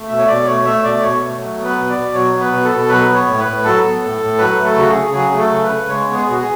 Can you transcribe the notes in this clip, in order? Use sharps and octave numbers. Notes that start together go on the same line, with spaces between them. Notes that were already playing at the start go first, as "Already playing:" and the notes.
Already playing: A3
B2 E5
C#5
B2 D5
A3 C#5
A3 E5
B2 D5
B2 C#5
A3
F#3
B3
B4
B2
D5
B2
F#3 C#5
B3
B4
B2
A4
B2
F#3 B4
B3
C#5
A2
B4
A2
F#3 A4
B3
A2
A2
F#3 B4
A3
A4
C#3 F#4
G#4
C#3
F#3 G#4
A3
A4
C#3
B4
C#3
G#3 C#5
B3
G#4
B2
F#4
G#4